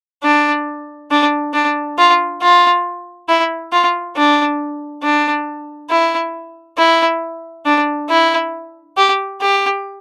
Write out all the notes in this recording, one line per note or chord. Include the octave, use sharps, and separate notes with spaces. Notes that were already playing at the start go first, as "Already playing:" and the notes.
D4
D4
D4
F4
F4
E4
F4
D4
D4
E4
E4
D4
E4
G4
G4